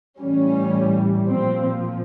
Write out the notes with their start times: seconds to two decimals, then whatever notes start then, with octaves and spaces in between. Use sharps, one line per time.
0.20 A2 E3 G3 C#4
1.28 A#2 F3 C4